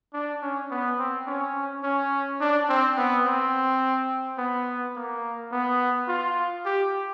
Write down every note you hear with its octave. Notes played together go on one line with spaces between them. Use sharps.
D4
C#4
B3
C4
C#4
C#4
D4
C4
B3
C4
B3
A#3
B3
F4
G4